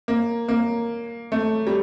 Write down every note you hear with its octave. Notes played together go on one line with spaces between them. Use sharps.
A#3
A#3
A3
G3